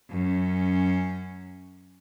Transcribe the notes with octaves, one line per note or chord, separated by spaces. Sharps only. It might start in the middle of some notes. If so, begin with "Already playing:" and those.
F#2 C#4